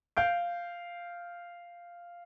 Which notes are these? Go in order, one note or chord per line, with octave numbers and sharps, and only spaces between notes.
F5 G6 D7